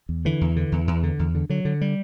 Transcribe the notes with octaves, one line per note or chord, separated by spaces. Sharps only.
E2
D3 E3
E2
D3
E2
E2
D3
E2
D3
D3 F#3
D3
G3